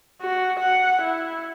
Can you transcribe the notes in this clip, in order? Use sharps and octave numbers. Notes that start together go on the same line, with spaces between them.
F#4
F#5
E4